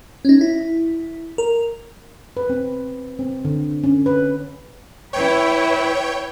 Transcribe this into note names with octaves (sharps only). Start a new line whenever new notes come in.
C#4 D#4
E4
A#4
B4
C4
C4
D3
C#4
B4
E4 B4 C#5 G5